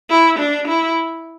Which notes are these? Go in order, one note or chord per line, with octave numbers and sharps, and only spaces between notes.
E4
D4
E4